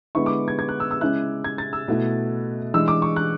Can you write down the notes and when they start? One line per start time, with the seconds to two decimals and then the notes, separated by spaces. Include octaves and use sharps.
0.15 D3 G#3 B3 E4 C#6
0.26 D6
0.48 G#6
0.59 G#6
0.69 F#6
0.80 E6
0.91 E6
1.01 C#3 G#3 C#4 E4 F#6
1.44 G#6
1.58 A6
1.73 E6
1.88 B2 A3 E4
2.74 E3 G#3 D4 E6
2.88 D6
3.02 C#6
3.16 F#6